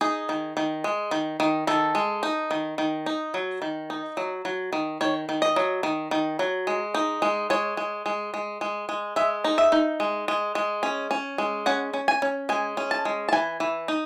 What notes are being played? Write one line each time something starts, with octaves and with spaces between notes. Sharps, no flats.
D#4 G#4
D#3
D#3
G#3
D#3
D#3
D#3 A4
G#3
D#4
D#3
D#3
D#4
F#3
D#3
D#4
F#3
F#3
D#3
D#3 C#5
D#3
D#5
F#3
D#3
D#3
F#3
G#3
D#4
G#3
G#3 C#5
G#3
G#3
G#3
G#3
G#3
G#3 E5
D#4
E5
D#4
G#3
G#3
G#3
C#4
C#4
G#3
C#4 F#5
C#4
G#5
C#4
G#3 G#5
C#4
A5
G#3
A5
E3 G#5
E3
D#4